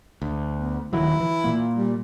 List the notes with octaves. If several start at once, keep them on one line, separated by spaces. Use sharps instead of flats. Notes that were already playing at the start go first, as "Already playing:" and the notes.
D2
B3
D#1 D#3 F#3 E4
E3
A#2 A#3
G3